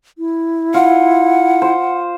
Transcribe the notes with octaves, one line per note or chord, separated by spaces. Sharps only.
E4
F4 F#5
C5